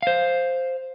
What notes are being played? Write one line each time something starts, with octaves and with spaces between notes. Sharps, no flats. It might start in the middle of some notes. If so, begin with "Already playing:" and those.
C5 F5